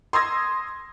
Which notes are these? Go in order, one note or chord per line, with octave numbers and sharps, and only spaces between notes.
C6 D#6 E6 G#6 A#6